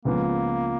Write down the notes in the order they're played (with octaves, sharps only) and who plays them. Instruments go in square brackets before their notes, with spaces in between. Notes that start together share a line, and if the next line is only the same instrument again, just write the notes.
[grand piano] C#2 C#3 F3 B3 F4 [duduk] A#3